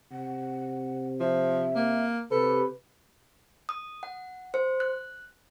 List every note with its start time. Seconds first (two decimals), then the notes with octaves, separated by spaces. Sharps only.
0.12 C3 F#5
1.20 F3 E5
1.76 A#3
2.31 C3 G4 A4 B4
3.69 D#6
4.03 F#5
4.54 C5
4.80 F#6